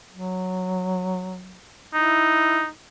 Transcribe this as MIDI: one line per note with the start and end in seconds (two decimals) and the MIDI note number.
0.12 1.60 54
1.94 2.68 63
1.94 2.63 64